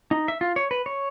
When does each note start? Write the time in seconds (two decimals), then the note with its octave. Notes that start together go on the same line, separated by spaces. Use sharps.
0.11 D#4
0.28 E5
0.41 F4
0.56 C#5
0.71 B4
0.86 C#5